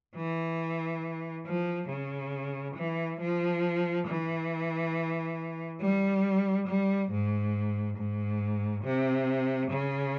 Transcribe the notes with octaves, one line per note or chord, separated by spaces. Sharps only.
E3
F3
C#3
E3
F3
E3
G3
G3
G#2
G#2
C3
C#3